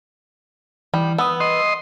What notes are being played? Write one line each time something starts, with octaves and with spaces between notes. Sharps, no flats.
E3 G3
B3 D#6 E6
D#5 C6